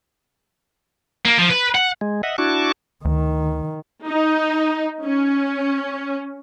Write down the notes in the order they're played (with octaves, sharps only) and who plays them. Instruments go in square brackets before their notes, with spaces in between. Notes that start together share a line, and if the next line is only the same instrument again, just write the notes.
[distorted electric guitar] A#3
F3
B4
F#5
[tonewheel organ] G#3
D#5 E5 F#5
D4 E4 F#4 A5 C#6 D6
[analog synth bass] D2 [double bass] D#3
[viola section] D#4
C#4